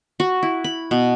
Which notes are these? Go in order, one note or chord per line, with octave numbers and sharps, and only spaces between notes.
F#4
E4
B5
B2